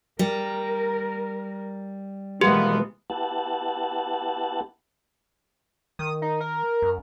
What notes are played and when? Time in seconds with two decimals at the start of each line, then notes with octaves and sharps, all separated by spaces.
0.19 G3 A#4
2.41 B2 E3 F3 G#3 A#3 B3 G4
3.10 B3 E4 G4 F#5 A5
5.99 D#3 D#6
6.22 D#4
6.41 A#4
6.82 F#2